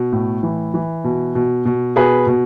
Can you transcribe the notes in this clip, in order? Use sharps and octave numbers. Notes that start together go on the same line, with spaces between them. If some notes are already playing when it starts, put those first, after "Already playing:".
Already playing: B2
A2
E3
E3
B2
B2
B2
B2 G#4 B4
B2